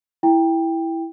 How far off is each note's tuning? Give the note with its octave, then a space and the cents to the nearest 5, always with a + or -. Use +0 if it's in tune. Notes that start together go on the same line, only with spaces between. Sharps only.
E4 +0 G5 +15